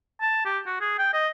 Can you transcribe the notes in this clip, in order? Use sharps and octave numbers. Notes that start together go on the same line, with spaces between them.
A5
G4
F#4
G#4
G5
D#5